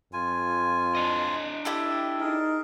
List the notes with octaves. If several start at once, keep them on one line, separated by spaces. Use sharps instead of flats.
F2 F4 G#5
D4 D#5
E4 G4 A4 E5
D#4 G#4 A#4